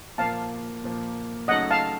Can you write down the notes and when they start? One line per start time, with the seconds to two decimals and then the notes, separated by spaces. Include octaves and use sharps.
0.18 A#2 F3 A#3 F5 A5
0.84 A#2 F3 A#3
1.48 C#3 F#3 A3 D#4 A4 D#5 F#5
1.70 F5 A5